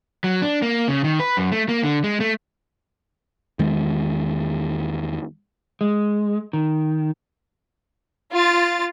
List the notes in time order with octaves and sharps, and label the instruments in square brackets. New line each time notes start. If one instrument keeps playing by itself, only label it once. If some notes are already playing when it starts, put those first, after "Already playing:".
[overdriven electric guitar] F#3
D4
A#3
C#3
D#3
B4
F#2
A3
A#3
D3
G#3
A3
[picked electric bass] E2 D#3 G#3
[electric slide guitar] G#3
D#3
[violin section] F4 A6